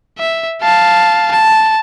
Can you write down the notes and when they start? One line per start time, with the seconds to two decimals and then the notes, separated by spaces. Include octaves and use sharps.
0.18 E5
0.62 F5 A5
1.32 A5